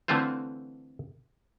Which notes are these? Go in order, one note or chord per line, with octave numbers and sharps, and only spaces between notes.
D3 E3 A3 C4 F4 C5